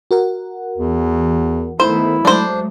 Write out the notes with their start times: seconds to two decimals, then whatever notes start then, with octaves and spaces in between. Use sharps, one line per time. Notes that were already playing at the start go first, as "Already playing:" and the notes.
0.11 F#4 A#4 F#5
0.78 E2 E3
1.80 D#3 A3 B3 E4 C5
2.25 F#3 G#3 A3 D4 C5